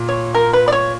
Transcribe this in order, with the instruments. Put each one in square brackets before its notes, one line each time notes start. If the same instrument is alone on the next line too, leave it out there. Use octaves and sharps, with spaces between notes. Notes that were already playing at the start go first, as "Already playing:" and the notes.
Already playing: [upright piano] A#2
[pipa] C#5
A#4
B4
D5
C#5